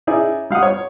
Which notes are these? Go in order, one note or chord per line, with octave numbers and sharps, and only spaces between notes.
C#4 D#4 E4 G#4 D5
G3 F5 F#5 D#6
C#5